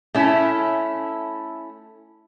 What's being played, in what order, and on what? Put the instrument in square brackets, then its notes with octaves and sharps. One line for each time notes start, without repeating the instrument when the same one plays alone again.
[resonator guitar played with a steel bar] A3 C#4 E4